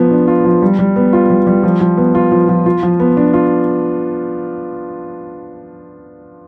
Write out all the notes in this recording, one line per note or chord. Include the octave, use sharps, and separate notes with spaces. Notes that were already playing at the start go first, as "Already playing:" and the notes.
Already playing: F3 B3 F4
D4
F4
F3
G3
G3
B3
F4
G3
G3
F3
F3
B3
F4
F3
F3
F4
F3
B3
D4
F4